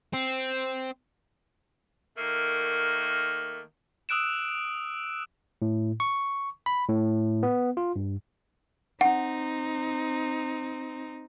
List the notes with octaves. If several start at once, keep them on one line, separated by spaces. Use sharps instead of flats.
C4
D#3 A3 A#3
D#6 E6 F#6 D7 E7
A2
C#6
B5
A2
B3
F4
G2
C4 D#4 F#5